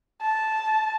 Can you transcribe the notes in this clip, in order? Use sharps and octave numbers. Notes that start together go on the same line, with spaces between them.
A5